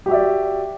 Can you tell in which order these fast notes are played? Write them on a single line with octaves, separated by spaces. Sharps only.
G4 F#4 E5 D5